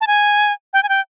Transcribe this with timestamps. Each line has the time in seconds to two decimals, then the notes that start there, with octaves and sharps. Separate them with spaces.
0.01 A5
0.07 G#5
0.73 G5
0.83 G#5
0.89 G5